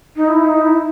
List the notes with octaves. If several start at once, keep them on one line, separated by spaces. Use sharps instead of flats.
D#4
E4
D#4
E4